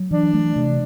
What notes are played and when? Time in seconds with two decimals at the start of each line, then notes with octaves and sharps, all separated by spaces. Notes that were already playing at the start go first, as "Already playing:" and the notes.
Already playing: F#3
0.11 E3 D4
0.34 A3
0.56 C3